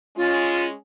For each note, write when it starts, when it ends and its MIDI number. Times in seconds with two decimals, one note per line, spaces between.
0.17 0.73 56
0.17 0.73 61
0.17 0.67 65